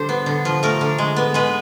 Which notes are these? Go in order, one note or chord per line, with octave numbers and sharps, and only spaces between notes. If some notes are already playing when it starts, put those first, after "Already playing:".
Already playing: D3 G3 C5
B3
D3
F3
A3 A#4
D3
G#3
B3
G#3 B4